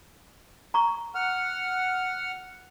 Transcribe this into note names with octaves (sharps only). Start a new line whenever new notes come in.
A#5 C#6
F#5 F6